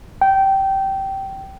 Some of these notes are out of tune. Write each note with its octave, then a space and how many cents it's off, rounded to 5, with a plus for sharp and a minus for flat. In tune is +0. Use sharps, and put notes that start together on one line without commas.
G5 -15